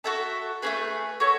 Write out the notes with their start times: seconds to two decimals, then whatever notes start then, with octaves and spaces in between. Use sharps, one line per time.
0.04 F#4 A4 E5 A5
0.62 A3 C#4 G#4 B4
1.20 F#4 A4 C#5 E5